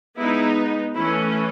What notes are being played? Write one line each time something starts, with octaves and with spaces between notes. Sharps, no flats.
G#3 B3 D#4 E4
E3 A3 C#4 E4